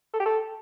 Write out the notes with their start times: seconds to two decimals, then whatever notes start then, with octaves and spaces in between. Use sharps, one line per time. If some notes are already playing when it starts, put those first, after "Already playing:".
0.14 A4
0.20 G4
0.26 A4